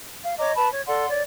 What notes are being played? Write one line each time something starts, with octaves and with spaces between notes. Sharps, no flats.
F5
C#5 D#5 A#5 D6
B4 A5 B5
C#5
A4 D5 F#5 C6
C#5 D5